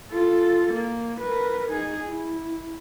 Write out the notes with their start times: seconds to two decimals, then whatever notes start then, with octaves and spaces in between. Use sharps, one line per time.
0.12 F4 A4
0.74 A#3
1.21 A#4 B4
1.72 D#4 G#4
2.08 E4